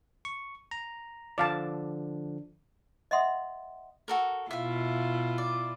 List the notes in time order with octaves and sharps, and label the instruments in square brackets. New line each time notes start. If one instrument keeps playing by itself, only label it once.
[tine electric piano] C#6
A#5
[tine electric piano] D3 F3 D4 [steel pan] D5 F5 A5
[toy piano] D#5 E5 F#5 C6 D#6
[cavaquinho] F#4 A4 A#4
[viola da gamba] B2 E4 F4 [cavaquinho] E5 F5
[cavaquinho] D5